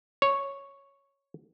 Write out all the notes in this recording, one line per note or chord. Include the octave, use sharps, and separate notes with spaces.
C#5